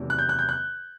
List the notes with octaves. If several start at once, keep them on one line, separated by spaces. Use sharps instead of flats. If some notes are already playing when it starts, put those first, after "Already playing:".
Already playing: E2 C3 D#3 F#3 A3
F#6
G6
F#6
G6
F#6